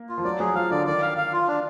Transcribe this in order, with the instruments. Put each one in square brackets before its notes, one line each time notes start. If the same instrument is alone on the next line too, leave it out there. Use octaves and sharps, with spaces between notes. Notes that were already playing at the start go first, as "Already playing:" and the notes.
Already playing: [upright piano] A#3
[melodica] F4
[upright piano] F3
[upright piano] F#3 [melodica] D5
[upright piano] F#3 [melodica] G#4
[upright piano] F3 [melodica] F5
[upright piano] D3 [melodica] D5
[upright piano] D#3 [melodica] D5
[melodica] F5
F5
F4
D4